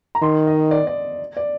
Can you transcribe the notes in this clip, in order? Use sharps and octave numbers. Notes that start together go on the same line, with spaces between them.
A#5
D#3 C6
D#5
D5
D5
D5